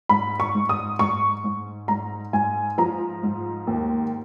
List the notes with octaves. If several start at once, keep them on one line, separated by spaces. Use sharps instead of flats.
G#2 B5
C#6
G#2
D#6
G#2 C#6
G#2
G#2 A#5
G#2 G#5
F3 A#5
G#2
D#2